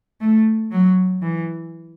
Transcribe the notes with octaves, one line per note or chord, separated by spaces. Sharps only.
A3
F#3
E3